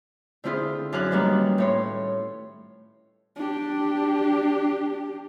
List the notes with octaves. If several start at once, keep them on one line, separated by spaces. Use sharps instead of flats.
D3 C4 E4 F4 G#4
F#2 D4 F5 G#5 F#6
D#3 G3 A#3 B3 C#4 D4
A2 C#5 C6
D4 G4